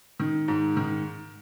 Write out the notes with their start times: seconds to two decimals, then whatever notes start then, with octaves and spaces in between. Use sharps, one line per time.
0.20 D#3
0.48 G#2
0.77 D#3